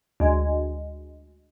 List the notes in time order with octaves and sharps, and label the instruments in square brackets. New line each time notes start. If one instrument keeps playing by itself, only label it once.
[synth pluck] D2 G#3